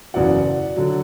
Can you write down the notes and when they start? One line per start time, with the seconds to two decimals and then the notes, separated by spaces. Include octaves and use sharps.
0.14 F#1 E2 B2 F#3 D5 F#5
0.76 D3 F#3